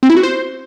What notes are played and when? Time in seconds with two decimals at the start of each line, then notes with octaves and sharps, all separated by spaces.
0.03 C4
0.10 E4
0.16 F#4
0.23 C5